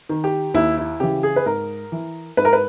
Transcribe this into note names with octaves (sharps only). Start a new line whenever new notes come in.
D#3
G4
D#2 E4
E4
C#3 E3 G4
G#4
B4
G#2 A#4
E3
G#2 B4
A#4
B4